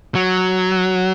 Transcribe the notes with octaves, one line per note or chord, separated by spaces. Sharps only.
F#3